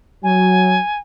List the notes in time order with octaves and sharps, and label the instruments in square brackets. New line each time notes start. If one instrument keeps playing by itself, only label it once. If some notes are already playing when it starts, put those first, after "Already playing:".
[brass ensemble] F#3 [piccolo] G#5